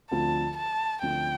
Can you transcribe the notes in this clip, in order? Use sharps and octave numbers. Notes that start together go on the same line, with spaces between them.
D2 D3 F3 C4 F4 A5
A5
D2 D3 F3 C4 F4 G5